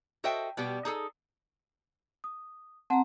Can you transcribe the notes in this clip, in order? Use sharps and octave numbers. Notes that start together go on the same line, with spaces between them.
F#4 A4 C5 D#5 E5 G5
B2 G3 B3 G4
D#4 G#4 A4
D#6
C4 F#5 A5 A#5